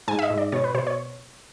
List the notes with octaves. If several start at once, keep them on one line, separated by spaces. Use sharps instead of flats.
G#2 G#5
E5
D#5
G#2
D5
B2 C#5
B4
B2 C5
C#5